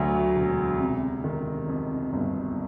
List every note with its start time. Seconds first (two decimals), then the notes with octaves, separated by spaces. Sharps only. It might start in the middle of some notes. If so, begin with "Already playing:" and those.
Already playing: D2 F#3
0.36 E1
0.80 C3
1.24 D#3
1.68 F2
2.13 G1